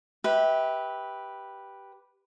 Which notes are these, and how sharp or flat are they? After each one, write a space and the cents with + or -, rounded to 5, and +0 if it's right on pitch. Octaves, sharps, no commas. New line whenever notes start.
G4 +0 B4 -5 E5 -30